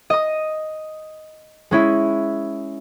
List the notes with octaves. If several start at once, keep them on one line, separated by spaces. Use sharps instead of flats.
D#5 D#6
G#3 C#4 E4